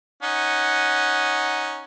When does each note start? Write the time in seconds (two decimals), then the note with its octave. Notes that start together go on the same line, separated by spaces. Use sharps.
0.23 C#4 D#4 F#5